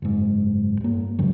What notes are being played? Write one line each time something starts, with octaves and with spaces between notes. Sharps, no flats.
F#1 G#2
G2 A#3
C#2 G#2 C#3 F#3